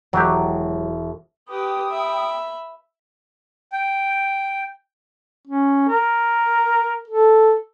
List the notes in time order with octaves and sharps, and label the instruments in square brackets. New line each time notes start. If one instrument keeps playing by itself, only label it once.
[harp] E1 [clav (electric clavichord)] F#3 G4
[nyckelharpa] G4 B4 [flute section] G5 D#6
[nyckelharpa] E5 B5
[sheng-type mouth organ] G5
[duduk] C#4
A#4
A4